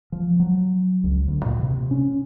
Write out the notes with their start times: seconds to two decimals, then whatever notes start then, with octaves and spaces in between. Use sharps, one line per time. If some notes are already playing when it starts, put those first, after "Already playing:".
0.12 F3
0.40 F#3
1.04 C#2
1.28 D2
1.45 A#2
1.63 C3
1.91 C#4